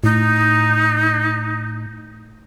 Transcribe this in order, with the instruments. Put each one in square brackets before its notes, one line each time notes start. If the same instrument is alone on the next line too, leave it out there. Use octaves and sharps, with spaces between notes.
[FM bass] A2 [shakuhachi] D#4